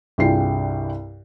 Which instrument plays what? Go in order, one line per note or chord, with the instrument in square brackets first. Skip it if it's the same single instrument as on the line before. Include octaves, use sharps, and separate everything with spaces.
[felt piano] C2 G2 F4 G#4 G5 C7